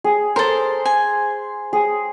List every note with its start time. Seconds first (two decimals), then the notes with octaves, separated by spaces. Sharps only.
0.04 G#4
0.36 A4 A#4 C5
0.85 G#5
1.73 G#4